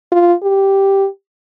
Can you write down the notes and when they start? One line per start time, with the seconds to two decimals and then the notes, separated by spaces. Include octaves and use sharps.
0.12 F4
0.43 G4